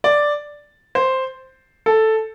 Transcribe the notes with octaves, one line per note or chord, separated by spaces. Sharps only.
D5
C5
A4